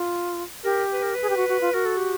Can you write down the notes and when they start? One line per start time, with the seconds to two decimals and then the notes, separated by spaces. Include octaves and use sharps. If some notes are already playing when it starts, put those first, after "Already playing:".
Already playing: F4
0.64 G4 A#4
0.93 B4
1.03 A#4
1.15 B4
1.22 G#4
1.30 G4
1.37 F#4
1.49 F#4
1.61 F4
1.73 F#4 A#4
1.85 A4
1.97 G4